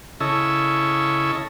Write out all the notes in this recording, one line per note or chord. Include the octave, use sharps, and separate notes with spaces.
C#3 E4 A4 C#5 D#5 E6